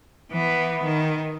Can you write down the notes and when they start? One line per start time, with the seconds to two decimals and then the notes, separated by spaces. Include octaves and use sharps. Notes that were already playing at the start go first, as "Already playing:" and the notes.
0.32 E3 B3
0.85 D#3